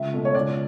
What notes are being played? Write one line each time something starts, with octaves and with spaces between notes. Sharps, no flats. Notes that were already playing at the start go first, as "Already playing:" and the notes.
Already playing: C#2 E5
B2 A3
C#5
C#2 D5